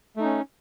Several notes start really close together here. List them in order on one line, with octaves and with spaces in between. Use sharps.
A3 D#4 C#4